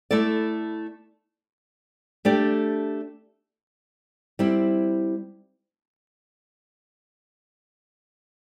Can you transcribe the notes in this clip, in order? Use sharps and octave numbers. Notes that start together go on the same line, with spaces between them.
A3 E4 A4 D5
A3 D4 G4 D5
G3 C4 E4